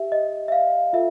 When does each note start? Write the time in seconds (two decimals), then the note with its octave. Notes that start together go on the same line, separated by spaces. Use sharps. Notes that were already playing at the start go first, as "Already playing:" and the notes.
Already playing: G4 E5
0.12 D#5
0.48 E5
0.52 F5
0.93 F4 A4 E5